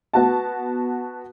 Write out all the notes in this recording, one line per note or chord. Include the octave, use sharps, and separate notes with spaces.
B3 F#4 A5